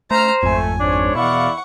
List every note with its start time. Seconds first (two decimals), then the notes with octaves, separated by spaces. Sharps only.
0.11 A3 C5 A#5 F6
0.43 G#1 F2 A3 G#5
0.80 G#2 D4 C5 C#5
1.15 E2 B2 E4 D5 F5 F#5 C#6